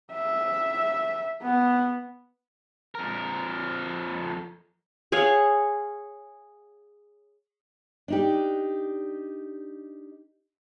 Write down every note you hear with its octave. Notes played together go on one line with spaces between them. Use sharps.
E5
B3
F2 A#4
G#4 C#5 F5 F#5
D4 D#4 G4